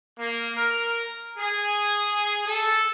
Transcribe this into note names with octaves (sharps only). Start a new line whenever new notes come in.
A#3
A#4
G#4
A4